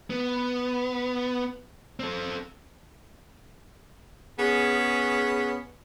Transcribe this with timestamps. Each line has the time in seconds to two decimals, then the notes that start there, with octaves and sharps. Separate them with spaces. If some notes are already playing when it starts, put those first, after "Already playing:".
0.10 B3
2.00 C4 A4
4.39 B3 C#4 G#4